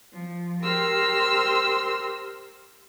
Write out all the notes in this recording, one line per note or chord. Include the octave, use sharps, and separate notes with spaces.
F3
G4 A#4 C5 C6 E6 F6